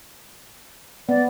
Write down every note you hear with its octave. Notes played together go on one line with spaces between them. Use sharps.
B3 D5